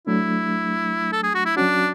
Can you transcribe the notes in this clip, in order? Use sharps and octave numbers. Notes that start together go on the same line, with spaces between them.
F#3 A3 D4 E4
A4
G#4
F#4
E4
F#3 C#4 D4 F#4